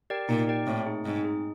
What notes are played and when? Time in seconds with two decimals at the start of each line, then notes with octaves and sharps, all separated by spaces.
0.10 G4 A#4 D5 G5
0.29 A#2 D#4
0.48 G4 A#4 D5 G5
0.67 A2 C4
0.86 D#4 G#4
1.05 G#2 C4
1.24 D#4 G#4